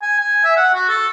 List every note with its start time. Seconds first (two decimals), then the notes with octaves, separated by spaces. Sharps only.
0.02 G#5
0.19 G#5
0.45 E5
0.57 F#5
0.74 F#4
0.89 A4